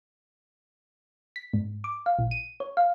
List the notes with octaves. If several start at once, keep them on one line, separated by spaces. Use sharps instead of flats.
B6
G#2
D6
F5
A#1
D#7
C#5
F5